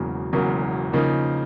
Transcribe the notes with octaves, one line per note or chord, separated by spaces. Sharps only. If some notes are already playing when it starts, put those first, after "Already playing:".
Already playing: E1 E2 C#3 F#3 A#3
E1 E2 C#3 F#3 A#3
C#3 F3 A#3 D#4